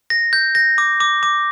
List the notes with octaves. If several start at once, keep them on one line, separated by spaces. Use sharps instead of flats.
A#6
G6
A#6
D6
D6
D6